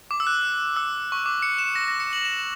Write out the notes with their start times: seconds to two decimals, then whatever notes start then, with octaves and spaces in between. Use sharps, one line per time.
0.11 D6
0.20 E6
0.27 F#6
0.76 E6
1.12 C#6
1.26 D6
1.42 C#7
1.58 E7
1.75 A#6
1.88 A#6
2.00 C#7
2.13 F#7
2.25 E7